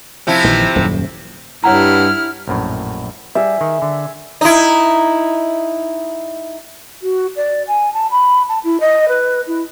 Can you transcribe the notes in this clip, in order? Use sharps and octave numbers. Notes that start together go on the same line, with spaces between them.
C3 F3 E4
A#1 D#3 E3
D#1 F#2
G2 E4 C#5 F#5 A#5 F6
A#1 F#2 A2
G3 G#4 E5
D#3
D3
D#4 E4
F#4
D5
G#5
A5
B5
A5
E4
D#5
B4
E4